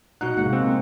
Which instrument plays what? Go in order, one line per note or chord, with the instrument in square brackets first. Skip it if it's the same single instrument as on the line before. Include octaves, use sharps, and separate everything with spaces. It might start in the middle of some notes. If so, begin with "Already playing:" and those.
[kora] B2 D#4 [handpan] F#5 [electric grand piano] F#6
[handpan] C3 G#3 A#3 [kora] F#5
[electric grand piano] C4